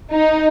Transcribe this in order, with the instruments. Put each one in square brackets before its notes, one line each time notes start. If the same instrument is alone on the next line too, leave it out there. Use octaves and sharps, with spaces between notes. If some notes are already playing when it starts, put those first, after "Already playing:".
[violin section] D#4